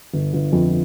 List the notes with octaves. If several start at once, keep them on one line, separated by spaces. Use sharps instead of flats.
G1
G1
F2